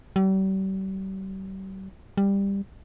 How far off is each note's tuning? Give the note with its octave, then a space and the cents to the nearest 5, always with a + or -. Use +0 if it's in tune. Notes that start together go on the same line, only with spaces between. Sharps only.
G3 -40
G3 +15